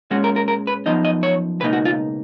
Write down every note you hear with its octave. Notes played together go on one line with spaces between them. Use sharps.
A#2 G#3 C#4 F#4
A#4
A#4
A#4
B4
F#2 F3 B3 D#4 D#5
D#5
C#5
C#2 B2 A#3 D#4 B4
F#4
F4